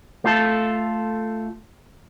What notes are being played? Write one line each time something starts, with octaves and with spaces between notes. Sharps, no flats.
A3 F4 A4